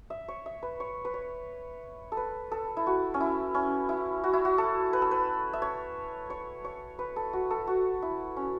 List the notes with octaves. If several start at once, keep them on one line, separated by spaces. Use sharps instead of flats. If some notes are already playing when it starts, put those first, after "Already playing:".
E5
C#5
E5
B4
C#5
B4
C#5
A4
B4
A4
E4
F#4
C#4
E4
C#4
E4
F#4
E4
F#4
A4
B4
A4
B4
E5
C#5
C#5
C#5
B4
A4
F#4
A4
F#4
E4
C#4